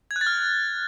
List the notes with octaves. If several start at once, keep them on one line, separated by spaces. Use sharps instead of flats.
G#6
F#6
A6
F6